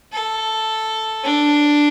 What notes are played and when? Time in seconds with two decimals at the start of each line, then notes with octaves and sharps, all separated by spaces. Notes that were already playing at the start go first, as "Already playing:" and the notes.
0.12 A4
1.24 D4